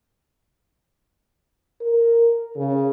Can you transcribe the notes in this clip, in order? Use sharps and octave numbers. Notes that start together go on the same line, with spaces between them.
A#4
C#3